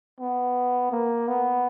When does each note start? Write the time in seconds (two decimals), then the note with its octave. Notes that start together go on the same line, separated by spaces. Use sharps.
0.20 B3
0.92 A#3
1.28 B3